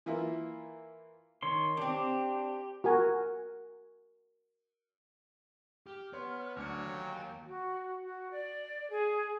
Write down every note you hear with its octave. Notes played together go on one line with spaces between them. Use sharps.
E3 A#3 E4 F4
D#3 C#5 C6
C4 D4 G4
F#4 A#4 G#5
G4 F6
B3 B4 C#5 C6
D2 F#3 D4 C#5 C#7
D#2 G5 G#5
F#4
F#4
D5
G#4